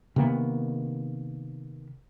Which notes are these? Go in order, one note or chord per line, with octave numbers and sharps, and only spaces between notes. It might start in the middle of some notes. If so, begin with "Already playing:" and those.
C3 D#3 A#3 B3